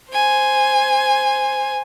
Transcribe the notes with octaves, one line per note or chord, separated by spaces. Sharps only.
C5 G#5